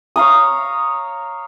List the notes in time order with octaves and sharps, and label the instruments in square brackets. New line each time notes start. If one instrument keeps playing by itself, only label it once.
[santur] C#5 F5 A#5 D#6